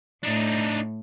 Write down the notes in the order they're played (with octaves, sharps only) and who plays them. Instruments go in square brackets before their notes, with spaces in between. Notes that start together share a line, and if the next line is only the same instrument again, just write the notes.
[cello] A2 [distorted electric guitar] D4 D#4